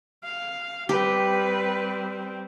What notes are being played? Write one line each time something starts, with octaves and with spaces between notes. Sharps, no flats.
F5
G3 C4 G4 B4